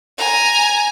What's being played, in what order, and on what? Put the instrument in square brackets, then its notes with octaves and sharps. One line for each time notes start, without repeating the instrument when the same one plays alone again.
[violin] G#5 A#5